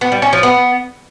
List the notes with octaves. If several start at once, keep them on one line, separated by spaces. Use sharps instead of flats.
B3
G3
C#4
F3
B3